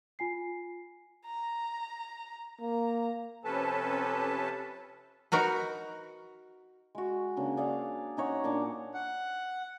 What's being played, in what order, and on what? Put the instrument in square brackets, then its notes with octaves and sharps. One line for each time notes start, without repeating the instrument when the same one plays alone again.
[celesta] F4 G#5 C7
[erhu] A#5
[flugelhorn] A#3 [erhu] A#5
[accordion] C3 F3 C#4 A4 B4 A5
[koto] D#4 F#4 A#4 B4
[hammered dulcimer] G#3 F#4
C#3 A#3 C#4 D4
G#4 D5 F5 F#5
C#4 D#4 C#5 F#5
A#2 D4 D6
[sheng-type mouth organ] F#5